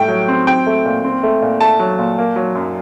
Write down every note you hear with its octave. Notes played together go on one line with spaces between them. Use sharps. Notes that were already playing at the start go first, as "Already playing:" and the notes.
Already playing: A2 G3 A3 G5
F#3
C4
C4 G5
A3
A#2
C4
A3
A#2
A3 A5
F#3
A#2
A#3
F#3
F#2